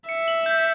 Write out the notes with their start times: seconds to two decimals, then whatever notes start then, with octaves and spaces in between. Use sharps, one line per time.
0.09 E5 C#7
0.28 F#7
0.46 G6